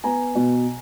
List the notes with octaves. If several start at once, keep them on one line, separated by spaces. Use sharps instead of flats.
B3 G#5 A#5
B2